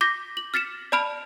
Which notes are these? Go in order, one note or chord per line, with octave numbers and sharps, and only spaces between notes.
D6 G6 A#6 B6
F#7
F6 A6 B6 C#7 E7
D5 A5 B5 F6 D7 F7